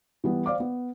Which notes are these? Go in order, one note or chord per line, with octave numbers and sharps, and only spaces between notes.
E3 G3 B3
C5 D5 F5 D6
B3